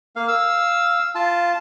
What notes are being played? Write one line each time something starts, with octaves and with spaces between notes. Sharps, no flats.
A#3 F5
F5 E6
F4 A5